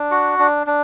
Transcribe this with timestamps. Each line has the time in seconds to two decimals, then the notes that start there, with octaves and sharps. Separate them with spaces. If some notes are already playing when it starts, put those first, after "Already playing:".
Already playing: D4
0.11 F#4
0.39 D4
0.67 D4